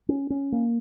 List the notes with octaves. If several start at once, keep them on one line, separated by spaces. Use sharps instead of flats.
C#4
C#4
A#3